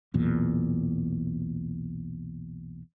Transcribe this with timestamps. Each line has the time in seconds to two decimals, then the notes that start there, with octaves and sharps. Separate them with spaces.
0.14 B1 E2 A#2